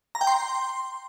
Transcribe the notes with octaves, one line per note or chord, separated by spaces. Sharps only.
A#5
G5
C6